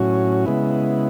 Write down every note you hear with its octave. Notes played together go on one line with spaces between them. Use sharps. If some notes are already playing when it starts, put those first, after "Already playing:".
Already playing: A2 F#3 C#4 F#4
C#3 G#3 B3 E4